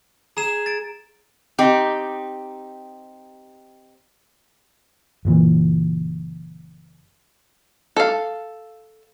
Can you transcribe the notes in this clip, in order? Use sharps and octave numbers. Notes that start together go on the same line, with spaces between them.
G#4 A#5 E7
A6 D7
C4 D#4 G4
F#1 A#2 E3
A4 F5